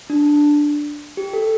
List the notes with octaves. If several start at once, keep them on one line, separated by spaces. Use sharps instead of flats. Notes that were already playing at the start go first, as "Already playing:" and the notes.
D4
G4
A4